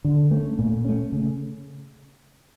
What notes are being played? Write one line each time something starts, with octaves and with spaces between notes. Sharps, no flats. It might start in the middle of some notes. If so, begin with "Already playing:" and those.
D3
A3
C#4
A#2
A3 C#4
C#3